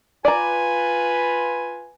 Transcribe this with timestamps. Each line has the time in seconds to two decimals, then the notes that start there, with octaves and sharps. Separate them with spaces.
0.25 F4 B4 D5 G#5 A#5